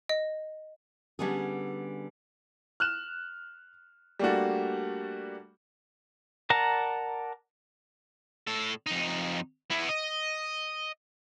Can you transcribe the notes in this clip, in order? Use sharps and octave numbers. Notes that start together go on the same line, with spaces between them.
D#5
D3 G3 B3 C#4 G#4
F6 F#6 E7
G3 A3 A#3 D4 F#4
A#4 D5 F#5 A5 A#5
A2 A4
F2 D#4
B3 E4
D#5